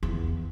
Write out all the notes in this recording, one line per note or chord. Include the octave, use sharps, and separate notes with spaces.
E2